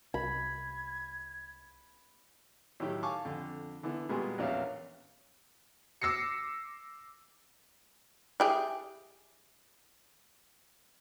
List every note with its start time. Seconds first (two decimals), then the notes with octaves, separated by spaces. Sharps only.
0.14 C2 B5 G#6
2.80 A2 D#3 F#3 G4
3.03 F5 G#5 A5 C#6 D6
3.25 F2 D3
3.83 D3 E3 B3 E4
4.09 A#2 G3 G#3 B3 F#4 G#4
4.38 A#1 E2 A#3 C#4 E5 F5
6.02 D6 E6 A#6 C7 C#7
8.40 E4 G4 G#4